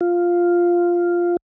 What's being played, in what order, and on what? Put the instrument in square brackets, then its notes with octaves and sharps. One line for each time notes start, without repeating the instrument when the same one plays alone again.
[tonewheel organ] F4